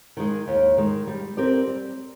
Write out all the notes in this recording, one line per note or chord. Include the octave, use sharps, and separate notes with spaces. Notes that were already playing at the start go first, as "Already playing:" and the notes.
D#3 G#3
D#2
D#3 G#3
G3
C4 G4 A#4 D5
G3